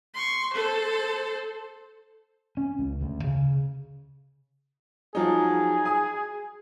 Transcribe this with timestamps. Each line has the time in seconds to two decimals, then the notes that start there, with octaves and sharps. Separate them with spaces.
0.14 C6 C#6
0.53 A4 C5
2.57 C#4
2.79 C#2
3.01 D2
3.24 C#3
5.15 F3 F#3 D#4 G#4
5.85 G#5 D#6